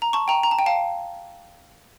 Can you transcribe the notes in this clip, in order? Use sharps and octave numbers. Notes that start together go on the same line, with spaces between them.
A#5
A5 C#6
G5 A#5
A#5
A5
G5
F5 A5